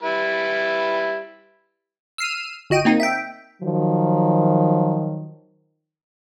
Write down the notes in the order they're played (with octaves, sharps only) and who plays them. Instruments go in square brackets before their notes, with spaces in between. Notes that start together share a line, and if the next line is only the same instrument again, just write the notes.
[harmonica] G3 E4 B4
[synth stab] E6 F6 C7 D#7
G1 F#4 D#5 G5 D#7
A#3 C4 D#4
E5 G5
[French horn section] D#3 F3 F#3